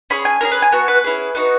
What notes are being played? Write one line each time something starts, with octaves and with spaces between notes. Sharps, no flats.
C#4 G#4 B5
G#5
C#4 E4 G#4 A#4
B4
G#5
B3 F#4
B4
C#4 E4 G#4
B3 D#4 F#4